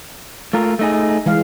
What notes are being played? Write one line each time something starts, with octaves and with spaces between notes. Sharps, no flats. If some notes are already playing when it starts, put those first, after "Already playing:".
A3 F4 A#4
A3 D#4 G#4
E3 G#3 F5